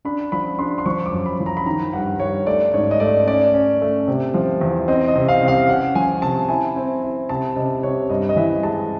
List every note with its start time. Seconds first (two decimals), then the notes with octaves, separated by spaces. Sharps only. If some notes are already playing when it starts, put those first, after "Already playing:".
0.05 D4 B5
0.32 F3 B5
0.59 D4 C6
0.78 C6
0.86 F3 C#6
1.06 D6
1.12 F#2
1.26 B5
1.40 F3
1.46 A#5
1.57 B5
1.66 D#3 A#5
1.93 G2 F#5
2.20 G2 C#5
2.47 A3 D5
2.74 G#2 C#5
2.91 D#5
3.00 A3 D5
3.27 C#4 D5
3.54 C#4
3.81 A3
4.08 C3
4.34 F3
4.61 E2
4.88 C4 D#5
5.08 D#5
5.15 C3
5.28 F5
5.42 C3
5.48 F5
5.69 C#4 F#5
5.95 F3 G#5
6.22 C3 A5
6.49 E4 G#5
6.76 C4
7.02 E4
7.29 C3 A5
7.56 C3 D#5
7.83 C3 C#5
8.10 G2 D#5
8.29 D#5
8.36 E3 E5
8.63 G#3 A5